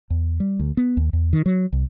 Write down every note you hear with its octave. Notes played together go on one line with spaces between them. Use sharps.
E2
G3
D2
B3
D#2
E2
D#3
F#3
C2